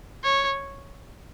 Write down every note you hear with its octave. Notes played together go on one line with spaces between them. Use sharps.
C#5